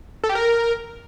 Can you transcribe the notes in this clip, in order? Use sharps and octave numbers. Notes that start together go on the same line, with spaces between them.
A4
G4
A#4